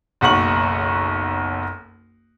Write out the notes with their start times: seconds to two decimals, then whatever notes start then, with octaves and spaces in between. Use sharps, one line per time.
0.21 F#1 B1 F#5 C#6 F#7